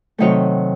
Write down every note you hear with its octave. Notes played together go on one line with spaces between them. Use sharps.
C3 D#3 F#3 A3 D#4 C#5